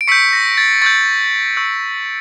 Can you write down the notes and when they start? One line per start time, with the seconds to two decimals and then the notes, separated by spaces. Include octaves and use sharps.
0.01 D7
0.08 C#6 E6 G6 B6 C#7
0.33 A#6
0.58 A6
0.82 C#6 E6 G6 A6
1.57 C#6 E6 G6